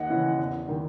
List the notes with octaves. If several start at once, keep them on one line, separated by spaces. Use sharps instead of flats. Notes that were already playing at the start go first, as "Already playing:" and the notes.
Already playing: D#2 D#5 F#5
C#3 E3
E2
D#3